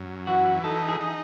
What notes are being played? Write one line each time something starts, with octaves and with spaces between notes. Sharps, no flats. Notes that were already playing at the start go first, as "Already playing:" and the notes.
Already playing: F#2
E3 F#4
D#4 A4
G#4
D#4